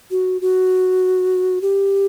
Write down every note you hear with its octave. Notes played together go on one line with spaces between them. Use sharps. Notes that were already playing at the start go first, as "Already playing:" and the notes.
F#4
F#4
G4